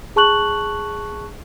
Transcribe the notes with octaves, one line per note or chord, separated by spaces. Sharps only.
G#4 A5 C#6 F#6 F#7